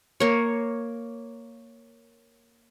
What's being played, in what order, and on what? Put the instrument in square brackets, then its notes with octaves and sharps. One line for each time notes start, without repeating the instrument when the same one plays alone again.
[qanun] A#3 C#5